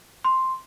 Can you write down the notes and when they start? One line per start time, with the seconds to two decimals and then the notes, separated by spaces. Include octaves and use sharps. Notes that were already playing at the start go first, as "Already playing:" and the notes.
0.24 C6